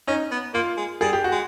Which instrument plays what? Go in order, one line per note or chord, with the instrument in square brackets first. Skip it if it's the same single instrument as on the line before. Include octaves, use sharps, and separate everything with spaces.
[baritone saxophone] C#4 [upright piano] D#4
[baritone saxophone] B3
[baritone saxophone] A#3 [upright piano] F4
[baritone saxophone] G#3
[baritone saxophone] G3 [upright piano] G#4
[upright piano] G4
F#4
[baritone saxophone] G#3